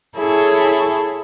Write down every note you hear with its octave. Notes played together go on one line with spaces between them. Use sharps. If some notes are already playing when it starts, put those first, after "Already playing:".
E4 G#4 A4 C#5